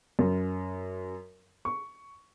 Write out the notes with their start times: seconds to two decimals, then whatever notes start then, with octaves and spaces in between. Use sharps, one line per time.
0.19 F#2
1.65 C#6